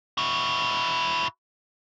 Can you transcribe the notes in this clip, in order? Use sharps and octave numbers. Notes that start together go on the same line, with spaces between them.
E4 F#4